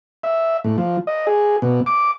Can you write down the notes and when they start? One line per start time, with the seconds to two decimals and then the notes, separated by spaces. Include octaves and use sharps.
0.23 E5
0.64 A2
0.78 F3
1.07 D#5
1.27 G#4
1.62 B2
1.86 D6